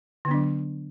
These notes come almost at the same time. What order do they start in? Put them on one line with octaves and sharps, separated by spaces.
D3 B3 D4 F#3